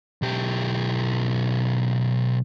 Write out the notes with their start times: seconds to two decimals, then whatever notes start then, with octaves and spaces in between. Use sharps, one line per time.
0.22 B1 G4